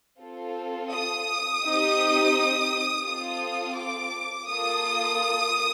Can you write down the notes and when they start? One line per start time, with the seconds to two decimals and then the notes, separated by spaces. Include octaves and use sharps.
0.21 C4 F4 A4
0.92 D#6
1.63 C4 D#4 G4
3.06 C4 F4 A4 D#6
3.77 D6
4.48 A#3 F4 A4 D#6